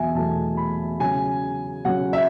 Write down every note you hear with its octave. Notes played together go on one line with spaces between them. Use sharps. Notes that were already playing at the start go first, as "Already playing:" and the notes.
Already playing: E2 B2 F#3 E5 G#5
E2 B2 F#3 A3 A5
B5
C#3 F#3 C#4 G#5
C#3 F#3 C#4 F#5
E5